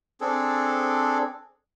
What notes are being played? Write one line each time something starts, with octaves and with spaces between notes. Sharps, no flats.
C4 D4 G#4 A4